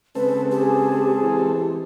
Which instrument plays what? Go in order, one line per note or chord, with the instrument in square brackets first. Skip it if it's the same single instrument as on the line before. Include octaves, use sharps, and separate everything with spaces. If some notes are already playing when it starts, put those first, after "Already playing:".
[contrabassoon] C#3 [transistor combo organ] G#3 C4 A4 [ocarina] B4
[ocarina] G4 [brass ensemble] G#4
[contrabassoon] E3